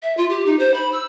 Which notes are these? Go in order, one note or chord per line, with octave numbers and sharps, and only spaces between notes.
E5
F4
G4
D#4
C5
B5
E6